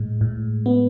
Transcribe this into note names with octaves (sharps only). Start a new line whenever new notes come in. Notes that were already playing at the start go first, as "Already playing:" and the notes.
Already playing: A2 G#3
A2
B3